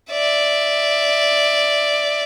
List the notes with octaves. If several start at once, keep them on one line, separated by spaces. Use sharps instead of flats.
D5 E5